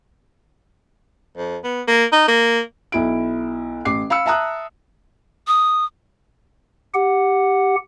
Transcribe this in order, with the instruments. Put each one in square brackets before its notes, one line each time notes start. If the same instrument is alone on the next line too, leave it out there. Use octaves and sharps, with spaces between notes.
[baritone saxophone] F2
B3
A#3
D#4
A#3
[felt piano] B1 E4 D7
A1 D6 C7
F5 B5 E6 C#7
E5 A5 A#5 D#6 F#6
[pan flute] D#6
[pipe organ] G4 F#5